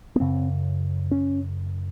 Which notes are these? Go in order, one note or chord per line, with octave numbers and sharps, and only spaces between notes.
B3
F#2 C#3 C4
C#4